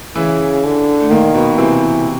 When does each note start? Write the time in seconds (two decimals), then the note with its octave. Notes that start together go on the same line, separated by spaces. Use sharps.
0.15 C#3 E3 E4
0.64 D3
1.00 A3
1.10 A#2 D#3 A#3
1.35 B2 B3
1.58 C3 E3 C4